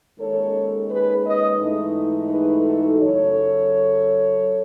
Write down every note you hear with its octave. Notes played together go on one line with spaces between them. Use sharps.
D#2 D#3 G#3 C#4 A4 C#5
G#4 B4
B4 D#5
G#2 E3 A3 D#4
G#4 B4
F#4 A4
F#2 C#3 F#3 A4 C#5